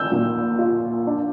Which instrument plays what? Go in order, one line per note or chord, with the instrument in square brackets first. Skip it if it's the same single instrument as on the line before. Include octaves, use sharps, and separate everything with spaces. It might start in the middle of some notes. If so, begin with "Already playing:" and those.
Already playing: [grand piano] E6 G6
[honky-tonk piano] A#2
F4
D4